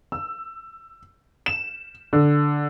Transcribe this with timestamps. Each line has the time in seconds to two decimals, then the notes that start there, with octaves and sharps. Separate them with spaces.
0.12 E6
1.46 E7
2.13 D3